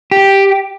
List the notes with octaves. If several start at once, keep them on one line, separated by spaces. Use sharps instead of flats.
G4